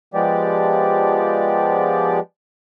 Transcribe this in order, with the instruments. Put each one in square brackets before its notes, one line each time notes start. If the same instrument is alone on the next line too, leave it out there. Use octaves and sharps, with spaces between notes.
[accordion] F3 G#3 B3 G4 D5